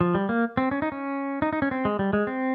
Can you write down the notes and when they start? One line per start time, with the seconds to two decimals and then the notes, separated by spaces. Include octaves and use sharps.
0.01 F3
0.15 G3
0.29 A#3
0.57 C4
0.71 C#4
0.82 D#4
0.92 C#4
1.42 D#4
1.53 D#4
1.62 C#4
1.71 C4
1.85 G#3
1.99 G3
2.13 G#3
2.27 C4